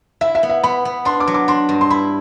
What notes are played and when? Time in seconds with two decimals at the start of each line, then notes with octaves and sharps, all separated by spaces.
0.21 E4 E5
0.35 E5
0.43 B3
0.50 E5
0.63 B3 B5
0.85 B3
1.05 D4 C6
1.20 D6
1.27 F#3
1.34 D6
1.48 D4 C6
1.69 G2
1.81 C6
1.90 E4 B5